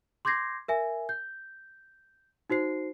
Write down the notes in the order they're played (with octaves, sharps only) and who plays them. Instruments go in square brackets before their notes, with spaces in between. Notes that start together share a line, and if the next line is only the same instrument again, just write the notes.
[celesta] C6 D6 G6 G#6 A#6 C7
A#4 E5 G#5
G6
D#4 F#4 C5 C7